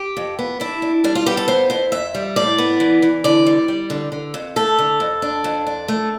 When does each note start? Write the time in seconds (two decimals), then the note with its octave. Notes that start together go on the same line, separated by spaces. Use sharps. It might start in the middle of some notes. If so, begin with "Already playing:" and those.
Already playing: G4
0.17 F2
0.39 B3
0.60 D4 E4
0.82 D4
1.04 G3 D4
1.15 F4
1.26 B3 G4
1.37 A4
1.48 F2 C5
1.70 F2 C5
1.92 F2 E5
2.15 G3
2.36 A2 D5
2.58 B3
2.80 E3
3.02 E3
3.24 D3 D5
3.46 G3
3.68 G3
3.90 D3
4.12 D3
4.34 F2
4.56 A3 A4
4.78 D3
5.00 F2
5.22 D4
5.44 F2
5.67 D4
5.88 A3